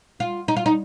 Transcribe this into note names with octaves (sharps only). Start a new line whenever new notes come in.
F4
D#4
F4
D#4